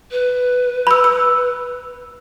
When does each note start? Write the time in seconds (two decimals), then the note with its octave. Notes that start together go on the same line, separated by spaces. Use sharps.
0.11 B4
0.87 B5 E6
1.04 E6